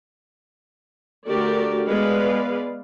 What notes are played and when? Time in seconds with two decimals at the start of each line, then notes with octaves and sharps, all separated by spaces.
1.26 D3 A3 F#4 G4 A#4 D5
1.87 G#3 B3 B4 D5 F5